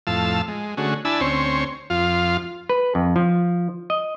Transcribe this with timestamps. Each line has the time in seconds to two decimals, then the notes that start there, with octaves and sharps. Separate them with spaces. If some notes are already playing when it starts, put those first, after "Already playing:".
0.07 F2 A2 F5 A5 E6
0.48 G#3
0.77 D3 A3 C#4 F#4 G#4
1.05 D4 E4 G#5 A5 B5 E6
1.21 D2 C4 C#4 C5 C#5
1.90 F2 F4 F5
2.69 B4
2.95 F2
3.16 F3
3.90 D#5